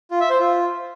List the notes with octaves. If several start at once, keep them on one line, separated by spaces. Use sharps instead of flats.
F4
E5
C5
F4